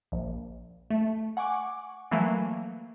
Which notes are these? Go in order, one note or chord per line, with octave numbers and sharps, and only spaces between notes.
A#1
A3
F#5 G#5 C#6 D6
E3 F#3 A3 A#3